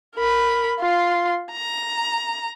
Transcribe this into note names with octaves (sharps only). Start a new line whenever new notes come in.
A#4 B5
F4 C6
A#5